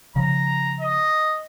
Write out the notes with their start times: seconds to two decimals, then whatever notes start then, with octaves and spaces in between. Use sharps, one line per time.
0.16 C#3 F3 A#5
0.81 D#5